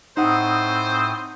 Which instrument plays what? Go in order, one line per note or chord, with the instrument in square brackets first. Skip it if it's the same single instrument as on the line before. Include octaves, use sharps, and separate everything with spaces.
[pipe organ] A2 C4 D#6 [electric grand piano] D#4 F#5 [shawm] C5